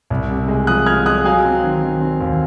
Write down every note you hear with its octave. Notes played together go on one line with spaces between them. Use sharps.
C2
C3
G#3
F3 D#6 F#6
F3 F6 G#6
G#3 D#6 F#6
F#3 F5 G#5
C4
D#3
D#3
C4
D#2